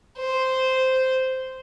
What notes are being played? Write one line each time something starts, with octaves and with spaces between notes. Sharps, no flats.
C5